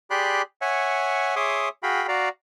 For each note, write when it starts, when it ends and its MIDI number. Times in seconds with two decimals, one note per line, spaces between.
0.11 0.42 67
0.11 0.42 68
0.11 0.42 74
0.11 0.42 83
0.11 0.42 84
0.11 0.42 90
0.62 1.35 73
0.62 1.35 76
0.62 1.35 78
0.62 1.35 80
1.36 1.69 68
1.36 1.69 73
1.36 1.69 76
1.36 1.69 84
1.36 1.69 86
1.36 1.69 87
1.83 2.07 66
1.83 2.07 68
1.83 2.07 77
1.83 2.07 79
1.83 2.07 83
2.08 2.29 66
2.08 2.29 74
2.08 2.29 77
2.08 2.29 82